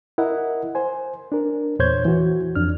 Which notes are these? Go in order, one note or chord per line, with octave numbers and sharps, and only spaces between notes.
E4 A#4 D#5 F#5
C5 G#5
D4 A#4
E2 A#2 C5 C#5 G6 G#6
E3 F#4
F2 D4 F6